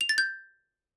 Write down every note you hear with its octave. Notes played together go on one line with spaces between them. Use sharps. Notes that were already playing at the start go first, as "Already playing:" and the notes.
F7
A6
G6